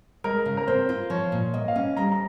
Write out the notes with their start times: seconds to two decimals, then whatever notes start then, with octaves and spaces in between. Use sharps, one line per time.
0.24 G#3 A#4
0.46 C#3
0.57 A#4
0.67 C4 C5
0.89 F4
1.10 F3 C#5
1.32 A#2
1.54 A#3 D#5
1.68 F5
1.76 C#4
1.97 G3 A#5
2.12 A#5